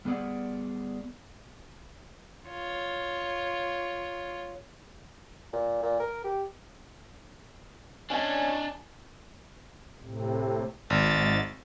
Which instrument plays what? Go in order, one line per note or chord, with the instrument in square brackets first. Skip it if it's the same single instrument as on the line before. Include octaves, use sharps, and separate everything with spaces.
[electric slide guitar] G3 B3 G#4 D5 F#5
[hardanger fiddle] F4 C#5
[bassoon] A#2
A#2
A#4
G4
[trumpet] C#4 [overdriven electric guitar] D4 D#5 [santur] G#5 A5
[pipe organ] A2 C3
[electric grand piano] G#1 [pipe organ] G#2 A6